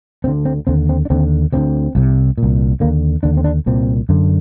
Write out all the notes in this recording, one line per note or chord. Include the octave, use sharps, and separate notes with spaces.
D2 D3 C4
C4
D#2 D3 C4
C4
D4
D#2 D3 C4
D2 D3 C4
C2 C3
A#2
C2
D#2 D3 A#3
D#2 D3 D4
C4
D4
C2 A#2 C4
F#2 D3